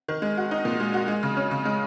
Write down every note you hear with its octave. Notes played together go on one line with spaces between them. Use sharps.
D#3
G#3
F#4
D#4
A#2
G#3
F#4
G#3
C#3
C#4
C#3
G#3